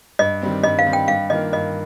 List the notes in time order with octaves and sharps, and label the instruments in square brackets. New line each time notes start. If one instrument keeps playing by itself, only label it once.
[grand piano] G2 [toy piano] D#5
[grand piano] D#3 G3 C4
[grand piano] G2 [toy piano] D#5
[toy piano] F5
[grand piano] D#3 G3 C4
[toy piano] G5
[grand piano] G2 [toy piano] F5
[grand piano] D#3 A#3 F4 A#4 [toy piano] D#5
[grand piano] G2 [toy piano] D#5